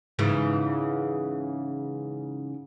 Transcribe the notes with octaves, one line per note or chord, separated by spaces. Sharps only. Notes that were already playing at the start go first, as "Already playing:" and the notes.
G#2 C#3 E3